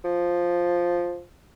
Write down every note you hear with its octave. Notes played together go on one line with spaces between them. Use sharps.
F3